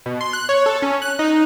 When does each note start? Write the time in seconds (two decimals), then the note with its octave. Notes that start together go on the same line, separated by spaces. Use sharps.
0.06 B2
0.21 C6
0.33 F#6
0.49 C#5
0.66 A4
0.82 C#4
1.02 F#6
1.19 D#4